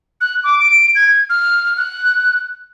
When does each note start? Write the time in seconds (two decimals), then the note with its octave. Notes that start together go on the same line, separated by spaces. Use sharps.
0.21 F#6
0.44 D6
0.60 D7
0.95 G#6
1.30 F6
1.77 F#6